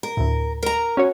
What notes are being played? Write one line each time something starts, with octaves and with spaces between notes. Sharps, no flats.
A#4
D2 A2
A#4 A#5
C#4 F#4 C#5